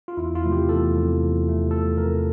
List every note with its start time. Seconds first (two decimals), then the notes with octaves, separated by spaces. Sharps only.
0.08 F4
0.17 E2 E4
0.35 F4
0.44 C3 F3 A3
0.52 G4
0.69 E2 A4
0.95 C3 F3 A3
1.20 E2
1.45 C3 F3 A3
1.71 E2 A4
1.96 C3 F3 A3 A#4